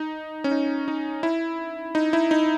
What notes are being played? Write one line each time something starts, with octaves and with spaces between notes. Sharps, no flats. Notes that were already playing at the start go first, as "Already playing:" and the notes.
Already playing: D#4
C#4
D#4
D#4
E4
D#4
E4
D#4